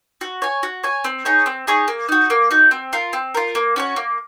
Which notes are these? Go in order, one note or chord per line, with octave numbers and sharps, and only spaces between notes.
F#4
C#5 G#5
F#4
C#5 G#5
C4
D#4 G#4 C#5
C4
D#4 G#4 C#5
A#3
D#4 F#4
A#3
D#4 F#4
C4
F4 A#4
C4
F4 A#4
A#3
C#4 F#4 C#5
A#3